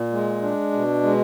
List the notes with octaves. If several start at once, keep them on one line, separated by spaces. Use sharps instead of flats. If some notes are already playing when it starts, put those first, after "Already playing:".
Already playing: A#2
G#3
D4
B2
G#3